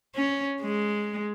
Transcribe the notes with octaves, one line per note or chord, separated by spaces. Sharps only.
C#4
G#3